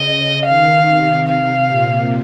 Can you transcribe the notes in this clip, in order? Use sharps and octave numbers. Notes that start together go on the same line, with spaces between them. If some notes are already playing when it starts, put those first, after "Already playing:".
Already playing: C#3 D#5
D#3 F5
C3
F5
A#2